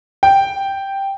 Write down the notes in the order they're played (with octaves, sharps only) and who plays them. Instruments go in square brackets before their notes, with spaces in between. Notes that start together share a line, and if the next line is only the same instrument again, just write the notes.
[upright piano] G5